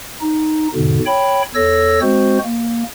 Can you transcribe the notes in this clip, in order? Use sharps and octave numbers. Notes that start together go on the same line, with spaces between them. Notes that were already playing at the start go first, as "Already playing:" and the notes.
D#4
E2 G#2 B2 D3
C#5 G5 B5
E2 A4 C#5 E6 A#6
G#3 C4 F#4 C5
A#3